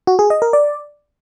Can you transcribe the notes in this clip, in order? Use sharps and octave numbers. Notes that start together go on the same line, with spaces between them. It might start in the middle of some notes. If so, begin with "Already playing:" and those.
F#4
G#4
D#5
A#4
D5